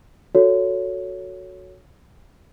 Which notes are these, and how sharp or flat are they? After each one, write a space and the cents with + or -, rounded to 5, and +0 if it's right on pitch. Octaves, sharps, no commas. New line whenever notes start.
F#4 -5 A4 +0 C#5 +15